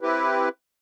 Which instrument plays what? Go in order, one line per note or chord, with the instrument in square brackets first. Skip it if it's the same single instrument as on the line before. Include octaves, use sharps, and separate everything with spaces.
[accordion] C4 E4 G4 B4